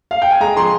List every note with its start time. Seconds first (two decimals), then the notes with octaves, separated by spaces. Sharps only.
0.11 F5
0.22 G5
0.31 G#5
0.40 G#3 A#5
0.57 F3 C6